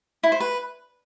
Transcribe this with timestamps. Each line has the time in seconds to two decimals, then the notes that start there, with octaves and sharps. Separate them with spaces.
0.23 E4
0.32 C5
0.40 B4